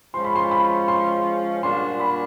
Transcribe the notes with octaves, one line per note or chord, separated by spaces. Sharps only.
F3 G#3 C#4 F4 C6
B5
C6
B5
C6
A#2 G3 A#3 D4 F#4 C6
B5